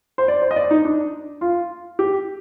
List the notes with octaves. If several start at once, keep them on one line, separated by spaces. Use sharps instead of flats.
C5
D5
C5
D#5
D5
D#4
D4
F4
G4